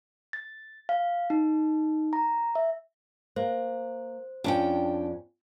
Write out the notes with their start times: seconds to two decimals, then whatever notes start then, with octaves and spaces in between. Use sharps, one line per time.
0.33 A6
0.89 F5
1.30 D#4
2.13 A#5
2.55 E5
3.36 A#3 C5
4.44 F2 C#4 D4 G5